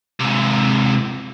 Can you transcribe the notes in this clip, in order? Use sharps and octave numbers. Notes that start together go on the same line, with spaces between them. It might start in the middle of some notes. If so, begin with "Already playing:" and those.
G#2 C3